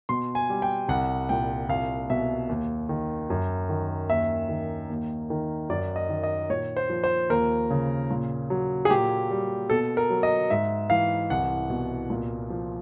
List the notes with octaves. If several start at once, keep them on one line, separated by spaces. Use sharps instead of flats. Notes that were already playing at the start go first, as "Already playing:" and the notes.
B2 C6
G#5
G3
G5
C2 F#5
A#2 G5
C2 F5
B2 E5
D#2
D#3
F#2
D#3
D#2 E5
D#3
D#2
D#3
F#2 D5
D#5
D#3
D#5
A#2 C#5
C5
F3
C5
D#2 A#4
C#3
A#2
F#3
G#4
A#2 G4
G3
B2 A4
A#4
F#3
D#5
G#2 E5
E3 F5
C2 F#5
B2
A#2
F3